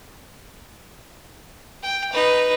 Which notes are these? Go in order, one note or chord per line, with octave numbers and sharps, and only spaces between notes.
G5
D#4 B4